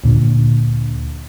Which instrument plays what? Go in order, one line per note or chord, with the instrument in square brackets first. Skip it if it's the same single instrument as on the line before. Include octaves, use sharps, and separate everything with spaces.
[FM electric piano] D2 A#2 D3